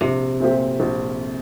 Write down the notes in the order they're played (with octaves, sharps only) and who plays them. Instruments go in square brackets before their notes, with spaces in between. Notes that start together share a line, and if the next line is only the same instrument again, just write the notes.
[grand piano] A#1 [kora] C3
[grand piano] A#2 A3 C4 G4
A#1